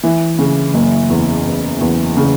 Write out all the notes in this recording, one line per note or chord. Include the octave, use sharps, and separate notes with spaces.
E3
C#3
F#1
E2
E2
E2
C#3